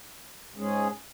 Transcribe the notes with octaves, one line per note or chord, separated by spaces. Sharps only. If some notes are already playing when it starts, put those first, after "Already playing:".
G#2 G#3 C#4 G#4